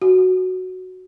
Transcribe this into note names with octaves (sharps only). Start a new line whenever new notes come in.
F#4